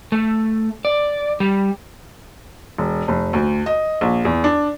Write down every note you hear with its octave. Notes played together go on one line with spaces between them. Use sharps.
A3
D5
G3
E1
F1
D2
D#5
A#1
E2
D4